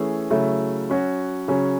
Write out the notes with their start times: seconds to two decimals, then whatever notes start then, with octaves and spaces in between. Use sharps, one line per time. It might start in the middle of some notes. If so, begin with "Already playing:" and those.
Already playing: E3 A3 C#4 G#4
0.30 C#3 F#3 A3 E4
0.90 F#3 C#4 F#4
1.48 C#3 F#3 C#4